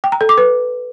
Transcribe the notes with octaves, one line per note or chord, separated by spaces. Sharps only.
G5
A#5
A4
D6
B4